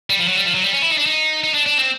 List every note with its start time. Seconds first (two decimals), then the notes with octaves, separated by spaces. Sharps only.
0.10 G3
0.19 F3
0.28 F#3
0.37 G3
0.46 F3
0.54 F#3
0.64 G3
0.73 C#4
0.82 E4
0.90 D#4
0.98 D4
1.06 D#4
1.44 D#4
1.54 D4
1.66 D4
1.78 C4